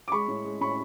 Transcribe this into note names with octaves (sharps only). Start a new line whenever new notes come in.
D6
G#3 B5 C#6
A2
G#3
A2 B5 C#6